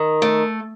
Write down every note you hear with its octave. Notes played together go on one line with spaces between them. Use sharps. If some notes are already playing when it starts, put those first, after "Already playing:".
Already playing: D#3
A3